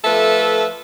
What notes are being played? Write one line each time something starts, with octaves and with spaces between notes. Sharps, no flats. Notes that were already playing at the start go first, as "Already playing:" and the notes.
F3 A3 A4 B4 E5